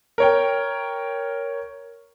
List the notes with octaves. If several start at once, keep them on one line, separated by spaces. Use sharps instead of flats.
A#4 C#5 G5